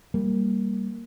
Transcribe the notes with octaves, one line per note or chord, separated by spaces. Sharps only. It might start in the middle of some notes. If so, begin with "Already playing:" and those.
G3 A#3